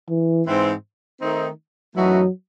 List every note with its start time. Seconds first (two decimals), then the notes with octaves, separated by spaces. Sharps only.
0.09 E3
0.46 G#2 E3 C4
1.21 D#3 A3 C4 D#4
1.96 F#2 E3 F#3 A3 D#4 F#4